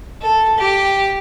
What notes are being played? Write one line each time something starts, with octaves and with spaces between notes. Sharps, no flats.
A4
G4